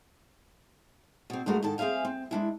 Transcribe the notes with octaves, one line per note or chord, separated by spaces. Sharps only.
B2 C4
G2 G#3 A3 F#4 A#4
G#2 D#3 A4 A5
C4 G#4 E5 F5 G#5
C4
G#3 D4 E4